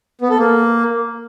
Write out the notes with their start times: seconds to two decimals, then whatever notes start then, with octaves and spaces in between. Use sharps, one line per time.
0.21 B3
0.30 A4
0.38 A#3